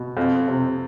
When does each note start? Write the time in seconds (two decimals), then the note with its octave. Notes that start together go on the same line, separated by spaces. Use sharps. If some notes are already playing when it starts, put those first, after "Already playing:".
Already playing: B2
0.17 F2
0.48 C3